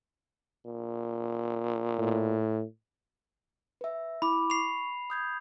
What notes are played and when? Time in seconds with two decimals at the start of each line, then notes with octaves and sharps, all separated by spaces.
0.66 A#2
1.99 A2
3.81 B4 E5
4.22 E4 B5 D6
4.50 C#6 C7 F7
5.10 D#6 G6 G#6